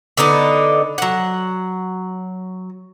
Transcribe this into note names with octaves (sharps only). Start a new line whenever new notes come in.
D3 B3 D#4 D5
F#3 F#5